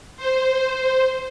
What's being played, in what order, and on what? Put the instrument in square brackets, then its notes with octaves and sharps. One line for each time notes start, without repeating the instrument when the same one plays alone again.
[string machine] C5